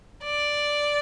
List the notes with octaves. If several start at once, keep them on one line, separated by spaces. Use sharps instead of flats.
D5